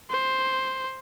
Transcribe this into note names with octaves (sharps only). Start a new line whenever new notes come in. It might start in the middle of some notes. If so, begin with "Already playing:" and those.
C5